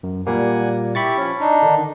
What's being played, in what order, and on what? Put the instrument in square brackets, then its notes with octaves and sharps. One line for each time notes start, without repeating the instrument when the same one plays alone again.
[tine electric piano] F#2
[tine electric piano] A#2 G3 A#3 [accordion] F#5 G#5
[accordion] E4 G4 [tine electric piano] B5 C#6 A6
[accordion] F3 C#4
D4 D#4
[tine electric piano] D3 D#3